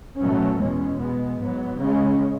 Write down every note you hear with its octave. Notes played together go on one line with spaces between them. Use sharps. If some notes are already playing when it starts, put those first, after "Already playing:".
B2 F#3 A3 C#4
E2 B2 G#3 C#4
B2 G#3 B3
G#2 F#3 B3
C#3 G#3 C#4